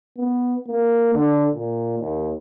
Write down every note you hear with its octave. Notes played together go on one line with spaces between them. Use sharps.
B3
A#3
D3
A#2
D#2